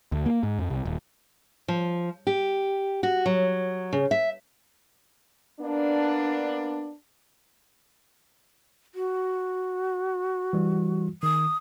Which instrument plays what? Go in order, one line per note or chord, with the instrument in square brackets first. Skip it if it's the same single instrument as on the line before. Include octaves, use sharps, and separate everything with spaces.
[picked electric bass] D2
A#3
G#2
F2
C2
D#1
[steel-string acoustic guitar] F3
G4
F#4
F#3
C#3
E5
[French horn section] A#3 B3 D4
[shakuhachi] F#4
[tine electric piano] E3 G3
[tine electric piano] D#3 [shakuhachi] D#6